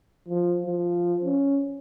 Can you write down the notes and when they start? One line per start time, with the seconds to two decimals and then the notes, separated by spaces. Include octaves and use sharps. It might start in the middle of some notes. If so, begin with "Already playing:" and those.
0.28 F3
0.66 F3
1.25 C#4